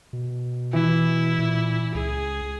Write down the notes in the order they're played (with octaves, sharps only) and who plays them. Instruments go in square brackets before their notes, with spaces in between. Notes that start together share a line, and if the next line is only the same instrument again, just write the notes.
[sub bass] B2
[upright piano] E3 [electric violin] E4
[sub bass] A#2
[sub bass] C#2 [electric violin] G#4